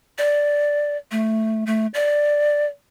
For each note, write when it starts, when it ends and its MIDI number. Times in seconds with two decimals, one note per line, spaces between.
0.18 0.97 74
1.11 1.64 57
1.66 1.87 57
1.94 2.65 74